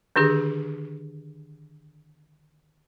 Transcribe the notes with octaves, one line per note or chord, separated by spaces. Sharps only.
D3 D#3 D4 G4 G#4